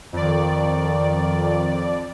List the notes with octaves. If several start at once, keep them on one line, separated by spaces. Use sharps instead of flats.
F2 D#3 D5